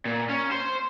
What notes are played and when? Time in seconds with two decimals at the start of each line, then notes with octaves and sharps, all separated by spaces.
0.05 A#2
0.29 C#4
0.52 C5